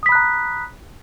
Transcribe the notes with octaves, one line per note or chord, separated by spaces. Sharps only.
A#5 B5 D#6 F#6 B6